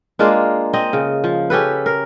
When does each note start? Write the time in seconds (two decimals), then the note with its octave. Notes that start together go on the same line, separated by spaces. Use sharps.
0.19 G#3 A#3 D4 F4
0.73 C4 D#5
0.93 C#3
1.24 F3
1.50 C#4 G4 A4 B4
1.86 A#4